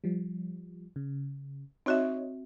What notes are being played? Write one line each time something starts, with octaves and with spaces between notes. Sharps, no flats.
F3 G3
C#3
C4 D#4 F#4 C#5 D#5 E5